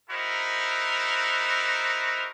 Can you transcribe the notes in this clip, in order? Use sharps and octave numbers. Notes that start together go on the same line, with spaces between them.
D#4 E4 F#4 A4 A#4 C5